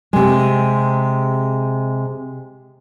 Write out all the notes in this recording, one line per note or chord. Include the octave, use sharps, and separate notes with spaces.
C3 G#3